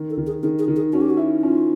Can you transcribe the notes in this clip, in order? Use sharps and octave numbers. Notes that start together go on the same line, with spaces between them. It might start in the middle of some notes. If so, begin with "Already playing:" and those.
Already playing: D#3
A4
D#3
G#4
D#3 G#4
G#4
D#3
G#4
C#4 F#4
G4
F#4
E4
C#4 F4